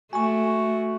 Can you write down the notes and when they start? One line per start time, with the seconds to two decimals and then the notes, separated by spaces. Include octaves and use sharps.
0.13 A3 F#4 G#5 C#6